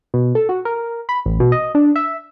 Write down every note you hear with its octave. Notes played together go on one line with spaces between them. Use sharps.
B2
A4
F#4
A#4
B5
A1
B2
D#5
D4
E5